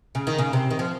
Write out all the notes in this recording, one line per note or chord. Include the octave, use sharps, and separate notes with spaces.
C#3
D#3
C#3
C3
D#3
F3